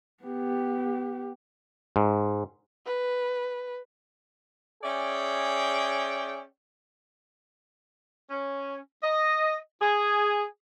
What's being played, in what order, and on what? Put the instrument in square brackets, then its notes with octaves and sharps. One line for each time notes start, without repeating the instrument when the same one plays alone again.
[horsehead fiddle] B3 G4
[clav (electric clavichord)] G#2
[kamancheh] B4
[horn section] C#4 G#4 D5 E5 G5
[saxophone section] C#4
D#5
G#4